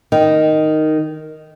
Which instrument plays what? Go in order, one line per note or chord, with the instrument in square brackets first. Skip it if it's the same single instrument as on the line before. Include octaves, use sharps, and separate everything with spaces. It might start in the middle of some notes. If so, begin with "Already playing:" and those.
[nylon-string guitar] D#3